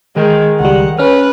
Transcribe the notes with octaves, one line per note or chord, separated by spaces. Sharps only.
D#3 G#3 A#4 G5
C#2 G3 F#5
C#4 B4 F6